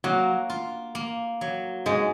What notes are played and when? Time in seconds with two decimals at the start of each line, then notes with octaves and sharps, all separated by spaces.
0.04 F#3 A#3
0.50 F4
0.95 A#3
1.41 F#3
1.86 G#2 G#3